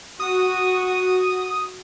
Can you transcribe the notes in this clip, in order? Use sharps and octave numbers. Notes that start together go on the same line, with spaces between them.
F#4 D#6